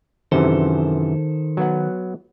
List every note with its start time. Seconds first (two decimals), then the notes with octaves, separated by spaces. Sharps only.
0.32 F#2 C3 D#3 E3 A4 C5
1.57 F#3 B3 F#5